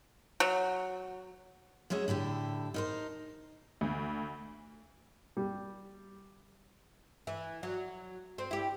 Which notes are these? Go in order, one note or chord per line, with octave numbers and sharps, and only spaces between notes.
F#3
F#3 G#3 C#4 G#4 E5
A2 D3 E4 G4
D#4 A#4 C5
D2
G3
E3
F#3
C4
E4 G4